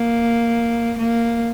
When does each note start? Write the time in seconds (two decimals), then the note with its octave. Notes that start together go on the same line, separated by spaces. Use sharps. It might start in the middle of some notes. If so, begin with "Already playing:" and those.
Already playing: A#3
0.98 A#3